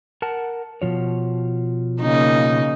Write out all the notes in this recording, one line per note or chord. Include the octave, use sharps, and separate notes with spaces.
A#4 F#5 A5
B2 F3 C#5
C#3 A#3 D#4